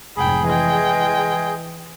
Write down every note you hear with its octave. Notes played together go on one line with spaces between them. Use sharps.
F1 G#2 G#4 G5 B5
E3 G#3 G5